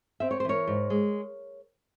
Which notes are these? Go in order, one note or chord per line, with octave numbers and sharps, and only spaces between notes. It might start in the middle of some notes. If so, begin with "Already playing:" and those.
C4 E5
C#5
C5
E3 A#4 C#5
G#2
G#3